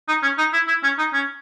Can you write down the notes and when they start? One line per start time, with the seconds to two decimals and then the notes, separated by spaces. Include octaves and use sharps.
0.08 D#4
0.22 C#4
0.38 D#4
0.53 E4
0.67 E4
0.83 C#4
0.98 D#4
1.13 C#4